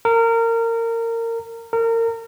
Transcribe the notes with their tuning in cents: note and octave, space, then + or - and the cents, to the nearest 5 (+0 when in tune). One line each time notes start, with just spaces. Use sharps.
A#4 -25
A#4 -30